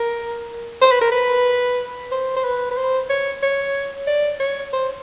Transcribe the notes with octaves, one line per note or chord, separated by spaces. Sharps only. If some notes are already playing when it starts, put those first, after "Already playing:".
Already playing: A#4
C5
B4
A#4
B4
C5
C5
B4
B4
C5
C#5
C#5
D5
C#5
C5